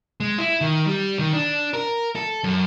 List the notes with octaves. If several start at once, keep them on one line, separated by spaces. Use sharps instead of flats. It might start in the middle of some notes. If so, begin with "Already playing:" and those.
G#3
E4
D#3
G3
D#3
D4
A#4
A4
F#2